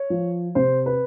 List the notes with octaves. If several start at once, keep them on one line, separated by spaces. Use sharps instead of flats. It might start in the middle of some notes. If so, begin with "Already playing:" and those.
Already playing: C#5
F3
C3 C5
B4